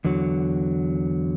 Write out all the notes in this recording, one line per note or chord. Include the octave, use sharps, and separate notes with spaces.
E2 D3 F#3